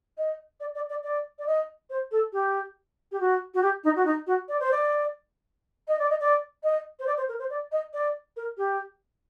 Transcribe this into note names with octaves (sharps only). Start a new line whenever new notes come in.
D#5
D5
D5
D5
D5
D5
D#5
C5
A4
G4
G4
F#4
F#4
G4
D#4
F#4
D#4
F#4
D5
C5
D5
D#5
D5
D#5
D5
D#5
C5
D5
C5
A#4
C5
D5
D#5
D5
A#4
G4